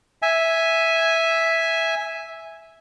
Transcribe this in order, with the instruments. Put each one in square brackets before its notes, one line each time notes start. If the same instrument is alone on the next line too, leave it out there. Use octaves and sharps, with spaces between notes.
[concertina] E5 G#5